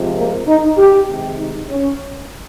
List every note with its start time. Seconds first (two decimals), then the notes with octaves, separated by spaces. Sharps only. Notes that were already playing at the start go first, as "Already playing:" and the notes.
Already playing: C3 F3 G#3
0.16 A#3
0.47 D#4
0.77 G4
1.08 C3 D#3 G#3
1.39 D#4
1.69 C#4